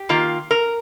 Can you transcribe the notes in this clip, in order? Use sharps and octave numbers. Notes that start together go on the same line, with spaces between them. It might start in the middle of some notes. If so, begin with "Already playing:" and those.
Already playing: G4
D#3 A#3 F4
A#4